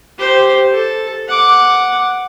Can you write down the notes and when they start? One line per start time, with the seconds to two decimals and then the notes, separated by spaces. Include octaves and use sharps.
0.18 G4 C5
0.72 A4
1.28 F#5 D6